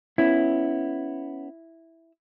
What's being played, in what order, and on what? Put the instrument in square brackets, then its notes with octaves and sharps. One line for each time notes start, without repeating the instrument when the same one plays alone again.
[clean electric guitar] B3 C#4 [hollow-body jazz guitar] E4